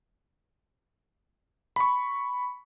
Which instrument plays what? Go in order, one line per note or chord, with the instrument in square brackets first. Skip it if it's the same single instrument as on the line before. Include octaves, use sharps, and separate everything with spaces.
[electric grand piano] B5 C#6